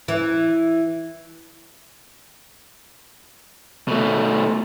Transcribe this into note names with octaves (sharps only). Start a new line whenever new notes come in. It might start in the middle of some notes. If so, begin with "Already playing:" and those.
E3
B2 A3